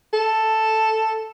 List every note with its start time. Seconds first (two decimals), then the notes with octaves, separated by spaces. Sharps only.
0.13 A4